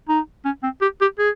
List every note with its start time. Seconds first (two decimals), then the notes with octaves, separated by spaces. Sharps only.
0.09 D#4
0.45 C#4
0.63 C4
0.81 G4
1.01 G4
1.18 G#4